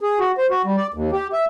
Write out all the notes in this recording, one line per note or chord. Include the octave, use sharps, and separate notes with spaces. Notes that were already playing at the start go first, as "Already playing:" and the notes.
G#4
F#4
C5
F#4
G3
D5
D#2
G4
E5